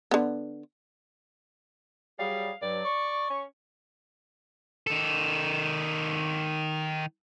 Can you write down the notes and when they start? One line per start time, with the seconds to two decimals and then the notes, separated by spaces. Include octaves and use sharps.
0.11 D3 B3
2.19 F#3 G3 G#4 F5
2.62 G2 F#3 D5
2.85 C#6
3.30 C#4
4.87 D#3 A4